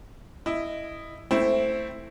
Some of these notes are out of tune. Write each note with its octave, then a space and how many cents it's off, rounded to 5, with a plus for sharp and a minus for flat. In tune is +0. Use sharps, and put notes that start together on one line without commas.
E4 +0 D#5 -10
A3 +10 C4 +0 E4 +0